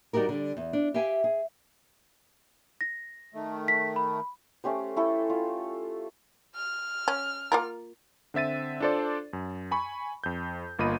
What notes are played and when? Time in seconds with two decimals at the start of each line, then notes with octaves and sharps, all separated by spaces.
0.13 G3 D#4 F#4 G4 A#4
0.29 D3 G3
0.57 E2
0.73 D4
0.94 G4 E5 F5 G5 G#5
1.24 G#4
2.81 A#6
3.34 D#3 A3
3.68 B6
3.96 B5
4.64 A3 C#4 G4 C5
4.96 A3 E4 A4
5.30 F4
6.56 F6
7.08 C#4
7.52 A#3 F4 A#4
8.34 D3 C4 E5 A6 D#7
8.80 D4 F4 A4 C5 D5
9.33 F#2
9.71 G#5 B5 C#6
10.24 F2 G6
10.79 G1 A#3 F4 D#5 B5 D#7